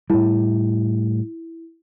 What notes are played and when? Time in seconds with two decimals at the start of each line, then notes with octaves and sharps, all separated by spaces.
0.10 A2 G3 E4